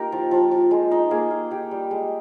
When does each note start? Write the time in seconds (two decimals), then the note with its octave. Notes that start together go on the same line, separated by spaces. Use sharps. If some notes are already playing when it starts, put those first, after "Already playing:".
Already playing: A#3 D#4 F4 G4 A#4
0.12 F3
0.31 F3
0.51 F3
0.71 G#3
0.91 D#4
1.11 A#3 F4 G#4
1.31 F4
1.51 D#4 G4
1.71 G3
1.91 G#3